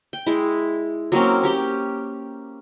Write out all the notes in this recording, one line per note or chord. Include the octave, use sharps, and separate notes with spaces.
G5
G#3 E4
F#3 A#3 C4 C#4
C#4 G4 G5